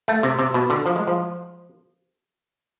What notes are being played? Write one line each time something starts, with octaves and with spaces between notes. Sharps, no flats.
A3
C3
C3
B2
D3
F3
G#3
F3